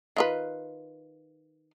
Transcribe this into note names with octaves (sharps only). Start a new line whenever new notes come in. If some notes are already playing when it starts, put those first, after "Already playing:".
D#3 F4 B4